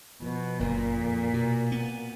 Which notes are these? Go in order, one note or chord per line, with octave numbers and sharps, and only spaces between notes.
B2 F3
F#1 A#2
F2
B2
B3